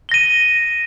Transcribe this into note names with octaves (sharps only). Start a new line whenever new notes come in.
A#6 D#7 G7